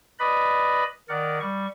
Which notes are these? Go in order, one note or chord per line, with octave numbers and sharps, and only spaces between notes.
B4 D5 D#5 B5
D#3 A#4 D5 F#5
G3 C#6